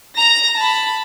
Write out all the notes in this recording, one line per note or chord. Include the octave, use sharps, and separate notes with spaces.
A#5 A#6
A5 B5